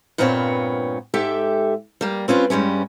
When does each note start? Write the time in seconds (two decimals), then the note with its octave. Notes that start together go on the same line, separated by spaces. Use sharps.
0.18 G2 A#2 B3 C4 G#4 C#5
1.14 G#2 G4 A4 E5 G5
2.01 G3 A#3
2.28 C4 C#4 F4 B4
2.50 G2 G3 G#3 C#4